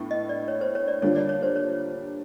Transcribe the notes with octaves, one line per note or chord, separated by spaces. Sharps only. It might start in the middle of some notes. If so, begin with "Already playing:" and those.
Already playing: A2 B3 D4
D#5
D5
C#5
C5
C#5
D5
D3 G3 A#3 D4 F4 C#5
D5
C#5
C5
C#5